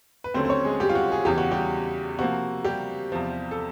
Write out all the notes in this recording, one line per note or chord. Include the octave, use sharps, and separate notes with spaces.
B4
D#2 D3 F#3 A3 C4 C#4 C5
C5
C#4 C#5
G#3 G#4
G3 G4
F4
F#4
G#4
E2 C#3 E3 G4
F#4
G3 G4
C3 F3 A#3 F#4
G3 G4
E2 C3 F3
A4